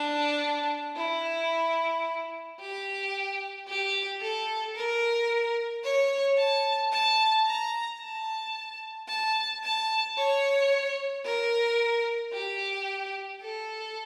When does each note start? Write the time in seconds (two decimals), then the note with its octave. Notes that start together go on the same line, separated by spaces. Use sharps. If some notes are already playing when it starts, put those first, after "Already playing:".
Already playing: D4
0.97 E4
2.60 G4
3.68 G4
4.21 A4
4.76 A#4
5.84 C#5
6.37 A5
6.92 A5
7.46 A#5
8.01 A5
9.08 A5
9.63 A5
10.17 C#5
11.25 A#4
12.33 G4
13.41 A4